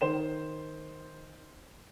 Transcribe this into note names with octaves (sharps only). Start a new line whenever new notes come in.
D#3 C5 E7